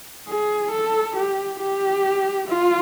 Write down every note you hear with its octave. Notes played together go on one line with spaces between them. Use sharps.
G#4
A4
G4
G4
F4